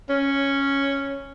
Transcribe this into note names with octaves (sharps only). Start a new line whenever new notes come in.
C#4